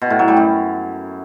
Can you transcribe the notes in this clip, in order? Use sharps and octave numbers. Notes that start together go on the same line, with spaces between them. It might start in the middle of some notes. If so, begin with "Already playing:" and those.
B2
A2
F#3
G3
F#2